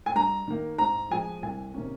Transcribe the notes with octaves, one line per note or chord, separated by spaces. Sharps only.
G#5
G2 A#5
D#3 A#3
G#2 A#5
F3 G#3 G#5
C2 G#5
C3 D#3 A#3 C#4